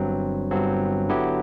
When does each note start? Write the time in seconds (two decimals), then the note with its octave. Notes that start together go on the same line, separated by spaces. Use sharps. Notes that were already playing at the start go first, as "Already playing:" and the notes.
Already playing: G1 G2 F#3 C4
0.51 G1 G2 F#3 C4
1.09 D3 F#3 B3 E4 G4